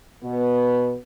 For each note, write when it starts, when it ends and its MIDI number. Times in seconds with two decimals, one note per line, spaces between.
0.24 0.97 47
0.24 0.97 59